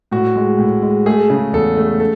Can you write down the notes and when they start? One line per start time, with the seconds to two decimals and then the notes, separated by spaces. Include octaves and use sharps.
0.11 A2 F#4
0.35 G#3
0.58 A2
0.82 G#3
1.06 A3 G#4
1.30 C#3
1.53 E2 A4
1.77 A3
2.00 A4